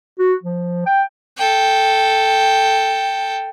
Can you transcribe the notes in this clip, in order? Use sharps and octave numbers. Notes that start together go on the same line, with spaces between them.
F#4
F3
G5
A4 G5